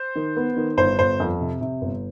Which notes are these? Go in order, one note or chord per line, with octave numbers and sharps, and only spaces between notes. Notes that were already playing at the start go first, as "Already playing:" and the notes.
Already playing: C5
D#3
B3
D#3
G1 C5
G1 C5
F2
C3
C3
G1